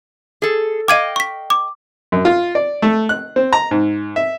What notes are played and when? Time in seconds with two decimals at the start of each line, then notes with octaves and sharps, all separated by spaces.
0.42 G#4 A4
0.88 D#5 F5 G5 D6 G#6 D#7
1.16 C#6 B6
1.50 D6
2.12 F#2
2.25 F4
2.55 D5
2.82 A3
3.09 F#6
3.36 C4
3.53 A#5
3.71 G#2
4.16 E5